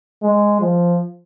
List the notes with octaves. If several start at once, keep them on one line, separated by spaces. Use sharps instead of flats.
G#3
F3